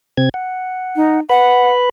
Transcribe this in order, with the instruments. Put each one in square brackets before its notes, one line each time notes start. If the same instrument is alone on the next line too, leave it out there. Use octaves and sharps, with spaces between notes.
[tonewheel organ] C3 C4 G#6
F#5
[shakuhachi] D#4
[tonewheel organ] B4 B5 [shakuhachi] F#5